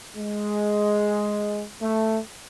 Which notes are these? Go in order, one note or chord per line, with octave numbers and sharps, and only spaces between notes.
G#3
A3